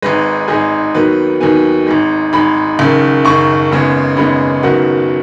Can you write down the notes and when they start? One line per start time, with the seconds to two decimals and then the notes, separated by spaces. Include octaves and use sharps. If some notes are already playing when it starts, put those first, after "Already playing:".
0.02 G#1 G#2 G#3 B4
0.48 G#1 G#2 G#3 G#4
0.95 D#2 D#3 F#3 B3 B4
1.40 D#2 D#3 F#3 B3 G#5
1.86 G#1 G#2 G#3
2.33 G#1 G#2 G#3 B5
2.79 F#1 F#2 D#3
3.25 F#1 F#2 D#3 C#6
3.72 G#1 F#2 C#3 G#3 B3
4.17 G#1 F#2 C#3 G#3 B3 B5
4.63 F#1 F#2 D#3 F#3 B3 F#5